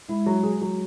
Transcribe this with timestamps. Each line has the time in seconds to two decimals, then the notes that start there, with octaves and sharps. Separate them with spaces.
0.09 G#3 E4
0.26 F#3
0.43 G#4
0.61 F#3